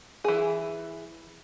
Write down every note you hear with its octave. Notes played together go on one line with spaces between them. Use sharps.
E3 G#4